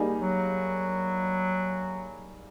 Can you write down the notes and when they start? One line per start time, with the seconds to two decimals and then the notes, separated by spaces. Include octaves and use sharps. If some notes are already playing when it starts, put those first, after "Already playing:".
Already playing: G3 A#3 D#4 G#4
0.21 F#3